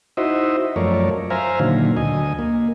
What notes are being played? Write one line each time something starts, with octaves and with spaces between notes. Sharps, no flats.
D#4 E4 F#4 C5 D#5 E5
F#2 F3 A3 A#4 C#5 D5
C5 E5 F5 G#5 A#5
A#2 D3 D#3 F#3
D2 D#5 G#5
A#3